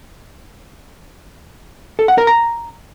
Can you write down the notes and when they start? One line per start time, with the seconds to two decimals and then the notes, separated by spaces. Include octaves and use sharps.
1.99 A4
2.08 F#5
2.18 A#4
2.27 A#5